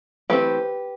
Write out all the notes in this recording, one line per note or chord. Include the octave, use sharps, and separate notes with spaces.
E3 A3 C4 G4 B4